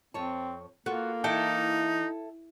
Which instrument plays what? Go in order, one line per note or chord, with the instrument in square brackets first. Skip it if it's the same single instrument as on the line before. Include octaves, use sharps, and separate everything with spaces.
[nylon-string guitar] F2 C#5 A5 [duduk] C4
[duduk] A#3 [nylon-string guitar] B3 F4 A4 [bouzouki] F#4
[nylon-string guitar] E3 [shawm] D#4 [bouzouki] E4 A4 G5